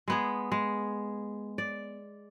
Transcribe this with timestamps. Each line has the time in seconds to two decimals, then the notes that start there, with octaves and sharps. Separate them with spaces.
0.08 G#3 B3 G#4
0.52 G#3
1.58 D5